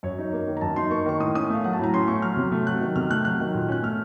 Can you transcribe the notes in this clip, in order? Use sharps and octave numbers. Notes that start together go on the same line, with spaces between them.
F#2 C#5
D#4
A#3
D#3
A#5
F#2 A5
D#4 C6
A#3 C#6
D#3 C#6
A2 D#6
C#4 D#6
A3 F5
F#3 F#5
A5
A2 A#5
C#4 C6
A3 C#6
F#3 F6
C3
A3
F#3 F#6
D#3
C3 F6
A3 F#6
F#3 F#6
D#3
A#2
C#4 F#6
A3 F6